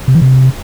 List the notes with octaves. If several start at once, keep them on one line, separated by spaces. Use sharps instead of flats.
C3
E3
C3